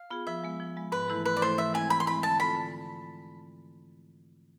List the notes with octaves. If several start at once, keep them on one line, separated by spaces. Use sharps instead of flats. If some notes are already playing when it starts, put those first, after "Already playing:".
Already playing: F5
B3 F4 G#4
F3 E5
G#3 B3
F3
G#3 B3
G#2 B4
E3 A3 E4 A4
G#2 B4
D5
E3 A3 E4 A4 C5
E3 E5
G#3 C4 E4 G#5
E3 B5
C6
G#3 C4 E4 B5
D3 A5
G#3 C4 F4 A4 B5
D3